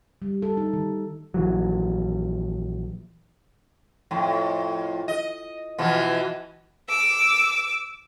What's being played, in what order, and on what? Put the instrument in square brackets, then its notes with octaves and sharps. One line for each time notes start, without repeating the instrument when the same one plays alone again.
[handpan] G3
A4
D#4
D#3
[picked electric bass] A#1 E3 F#3
[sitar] F2 A2
D#5
B2 E3 F3
[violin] D6 E6